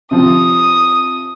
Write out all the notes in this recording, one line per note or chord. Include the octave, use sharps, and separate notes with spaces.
C3 F3 D#6